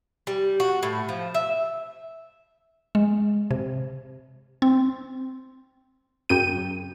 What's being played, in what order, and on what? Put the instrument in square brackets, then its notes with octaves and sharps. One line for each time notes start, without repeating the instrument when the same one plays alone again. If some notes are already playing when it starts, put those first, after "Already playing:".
[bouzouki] G3
F#4
A2
F3
E5
[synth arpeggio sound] G#3
C3
C4
[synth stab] F#2 C#3 G5 D#7